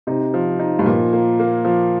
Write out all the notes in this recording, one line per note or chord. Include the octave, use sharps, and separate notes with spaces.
C3 D#4
F3
D#4
G2
A#2 F3
A#3
A#3
F3